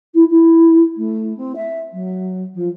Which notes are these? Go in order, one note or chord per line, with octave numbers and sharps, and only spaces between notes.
E4
E4
A3
C4
E5
F#3
F3